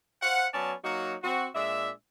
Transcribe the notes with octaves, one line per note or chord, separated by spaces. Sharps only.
C5 F5 F#5
F#3 B3 C#4 D5 A5
F#3 A#3 D#4 F#4
C4 F#4
A#2 G#3 D4 E5